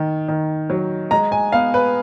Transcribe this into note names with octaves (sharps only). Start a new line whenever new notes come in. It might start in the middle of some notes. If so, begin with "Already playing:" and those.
Already playing: D#3
D#3
F#3
G#3 A#5
G#5
B3 F5
B4